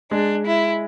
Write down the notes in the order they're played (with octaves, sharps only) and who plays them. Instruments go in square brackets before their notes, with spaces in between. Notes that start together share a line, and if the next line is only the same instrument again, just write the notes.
[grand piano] G#3 [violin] D4
[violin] E4